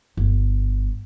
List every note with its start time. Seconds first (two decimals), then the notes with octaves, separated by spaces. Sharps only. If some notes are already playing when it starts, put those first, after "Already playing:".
0.17 G1